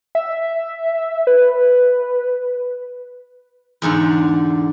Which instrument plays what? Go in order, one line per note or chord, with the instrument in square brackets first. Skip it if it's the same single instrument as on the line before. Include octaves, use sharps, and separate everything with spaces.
[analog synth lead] E5
B4
[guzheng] E2 G#2 D3